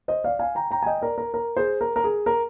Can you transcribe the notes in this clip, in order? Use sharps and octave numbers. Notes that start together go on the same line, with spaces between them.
C5 D#5
D5 F5
F5 G#5
G5 A#5
G5 A#5
G#5
D#5 G5
A#4 D5
A#4
A#4
G#4 C5
A#4
A#4
G#4
A#4